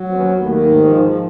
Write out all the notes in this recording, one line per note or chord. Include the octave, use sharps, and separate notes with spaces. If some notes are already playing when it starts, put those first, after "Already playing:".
Already playing: F#3
D#2 C4
B3 C#4
D#2
A3 B3
D#3
G#2 A3
F3
G#3
F3